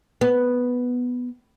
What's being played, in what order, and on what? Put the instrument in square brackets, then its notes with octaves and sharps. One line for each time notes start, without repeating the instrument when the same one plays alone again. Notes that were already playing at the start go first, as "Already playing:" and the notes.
[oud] B3